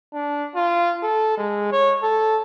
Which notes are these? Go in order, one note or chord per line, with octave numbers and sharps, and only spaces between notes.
D4
F4
A4
G#3
C#5
A4